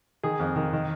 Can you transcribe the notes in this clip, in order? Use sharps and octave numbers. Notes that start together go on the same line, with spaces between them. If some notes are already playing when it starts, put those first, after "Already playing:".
D#3 G#4
F2
D#3
D#3